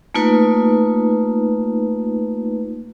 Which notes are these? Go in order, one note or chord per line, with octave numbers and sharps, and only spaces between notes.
A3 A#3 D#4 F4 B4